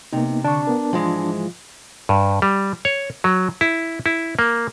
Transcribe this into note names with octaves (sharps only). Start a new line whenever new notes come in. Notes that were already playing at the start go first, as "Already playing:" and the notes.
C3 A#3 B3 D#4
D3 D4 C#6
B3 A#4
G#2 E3 F3 G#3 F4
G2
G3
C#5
F#3
E4
E4
A#3